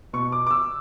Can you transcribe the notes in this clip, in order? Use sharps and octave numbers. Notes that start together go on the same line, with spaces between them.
B2 C#6
D6
D6
E6